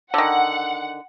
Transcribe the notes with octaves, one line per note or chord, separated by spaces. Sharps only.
D3 D#3 F#5